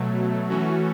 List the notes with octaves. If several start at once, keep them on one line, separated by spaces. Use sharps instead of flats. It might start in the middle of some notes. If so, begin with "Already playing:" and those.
Already playing: B2 F#3 A3
E3 A3 C#4 F#4